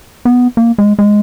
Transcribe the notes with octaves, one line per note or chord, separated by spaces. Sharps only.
B3
A#3
G#3
G#3